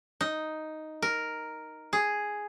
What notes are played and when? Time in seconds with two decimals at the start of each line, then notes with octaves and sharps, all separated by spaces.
0.21 D#4
1.02 A#4
1.93 G#4